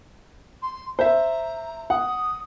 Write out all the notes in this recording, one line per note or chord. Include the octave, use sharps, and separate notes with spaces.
C6
C5 E5 A#5
F#5 D#6